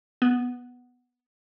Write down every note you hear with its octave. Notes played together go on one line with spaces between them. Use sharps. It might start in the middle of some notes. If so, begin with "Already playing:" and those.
B3